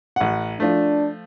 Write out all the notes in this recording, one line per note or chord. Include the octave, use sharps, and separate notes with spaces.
A1 F#5
F3 A3 D4